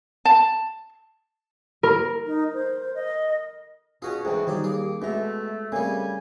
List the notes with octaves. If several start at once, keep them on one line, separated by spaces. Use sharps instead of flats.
A5
A#4
D#4
C5
D#5
B2 C#4 F4 F#4 G#4
G#2 E3 F#3 D4 F#4 G#4 G5
G2 D#3 F#3 G3 D#4 F4 G#4 D6
D#2 A#3 G#4 D6
B2 G#3 A3 E5 A#5
C#3 G3 A3 C4 A#4 G#5